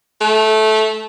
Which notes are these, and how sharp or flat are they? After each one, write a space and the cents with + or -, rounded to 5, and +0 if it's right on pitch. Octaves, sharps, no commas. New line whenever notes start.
A3 -15